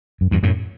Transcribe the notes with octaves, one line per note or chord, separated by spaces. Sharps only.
F#2
E2 G2
F#2 A2